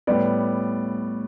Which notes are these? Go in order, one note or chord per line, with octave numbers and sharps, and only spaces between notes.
A2 G3 B3 D5